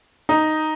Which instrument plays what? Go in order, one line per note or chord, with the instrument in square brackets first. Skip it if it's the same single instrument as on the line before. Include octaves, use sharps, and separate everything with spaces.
[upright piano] D#4